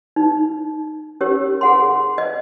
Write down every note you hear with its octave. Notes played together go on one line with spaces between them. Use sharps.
D#4
C#4 G4 A#4 C#5
G#4 F#5 C6
D#5